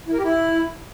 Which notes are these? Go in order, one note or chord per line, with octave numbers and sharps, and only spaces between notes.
E4
A#4
G4
E4